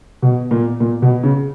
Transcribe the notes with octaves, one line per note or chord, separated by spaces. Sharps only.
B2
A#2
A#2
B2
C#3